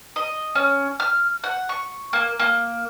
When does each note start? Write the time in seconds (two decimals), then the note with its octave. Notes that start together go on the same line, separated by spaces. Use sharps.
0.16 D#5
0.55 C#4
1.00 F6
1.44 F#5
1.69 C#6
2.13 A#3
2.40 A#3